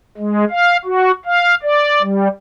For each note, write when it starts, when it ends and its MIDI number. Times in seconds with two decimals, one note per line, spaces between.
0.17 0.45 56
0.50 0.77 77
0.85 1.12 66
1.25 1.55 77
1.63 2.02 74
2.02 2.28 55